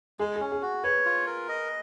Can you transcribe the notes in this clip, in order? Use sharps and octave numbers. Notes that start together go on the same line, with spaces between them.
G#3 G#4
C#4 G#4
G#4
F#4
B4 C#5
F4
A#4
D#5